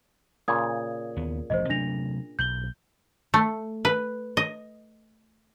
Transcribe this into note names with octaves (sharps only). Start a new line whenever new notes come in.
A#2 C#3 D#6 G#6
D#2 B3
E1 A1 F3 C5 D#5
C3 F#3 A3 D4 A#6 F7
B1 G6 F#7 G7
A3
B4
D#5